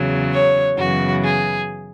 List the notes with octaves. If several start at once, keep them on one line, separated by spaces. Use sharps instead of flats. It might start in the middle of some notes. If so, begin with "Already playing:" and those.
Already playing: E2 C#3 F#3
C#5
F#2 C#3 E3 B3 F#4
G#4